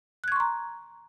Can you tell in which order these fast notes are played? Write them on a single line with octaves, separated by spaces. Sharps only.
F#6 G#6 C#6 C6 A#5